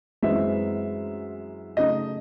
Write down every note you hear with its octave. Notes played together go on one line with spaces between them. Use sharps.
F#2 E3 G#3 C4 E4 E5
C#3 F#3 A3 D#4 D#5